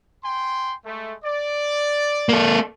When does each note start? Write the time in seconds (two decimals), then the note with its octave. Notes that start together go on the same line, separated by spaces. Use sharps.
0.24 G5 G#5 C6
0.85 G#3 A3
1.24 D5
2.29 A#3 A4